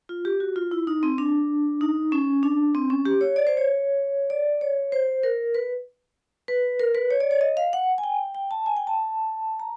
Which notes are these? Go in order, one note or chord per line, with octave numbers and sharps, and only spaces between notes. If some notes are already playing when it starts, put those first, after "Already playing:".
F4
G4
F#4
F4
E4
D#4
C4
D4
D#4
C#4
D4
C4
C#4
G4
C#5
D5
C5
C#5
D5
C#5
C5
A#4
B4
B4
A#4
B4
C#5
D5
C#5
D#5
F5
F#5
G#5
G5
G5
A5
G#5
G5
A5
A#5